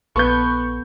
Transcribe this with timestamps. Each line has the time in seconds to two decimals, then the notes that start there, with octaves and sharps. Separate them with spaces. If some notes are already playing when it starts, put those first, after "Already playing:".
0.16 A#1 B3 A4 B4 C#6 G6